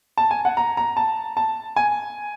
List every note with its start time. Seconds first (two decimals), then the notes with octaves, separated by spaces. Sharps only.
0.17 A5
0.31 G#5
0.45 F#5
0.57 A#5
0.77 A#5
0.97 A5
1.37 A5
1.76 G#5